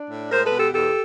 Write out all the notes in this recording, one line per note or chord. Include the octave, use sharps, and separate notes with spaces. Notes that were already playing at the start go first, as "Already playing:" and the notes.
Already playing: D4
A2
G#3 A#4 C5
A4 B4
B2
G4 A4
E2 G4 A4